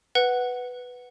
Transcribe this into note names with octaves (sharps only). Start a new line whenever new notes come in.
B4 F#5